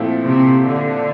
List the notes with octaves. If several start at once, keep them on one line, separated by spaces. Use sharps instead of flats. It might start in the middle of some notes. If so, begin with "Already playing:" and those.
Already playing: A#2 F3 A3 C4 E4
C3
D3